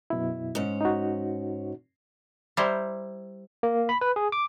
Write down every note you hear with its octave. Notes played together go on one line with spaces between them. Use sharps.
F#2 B2 E4
G#2 C#4
D#4 F#4
G3 E4 C5 A#5
A#3
B5
B4
G#4
D6